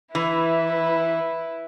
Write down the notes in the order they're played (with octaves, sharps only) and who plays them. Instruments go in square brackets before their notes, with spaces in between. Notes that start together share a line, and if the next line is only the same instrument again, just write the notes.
[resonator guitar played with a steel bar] E3 [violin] E4 B4